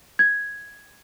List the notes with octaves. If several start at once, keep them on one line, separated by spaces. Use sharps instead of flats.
G#6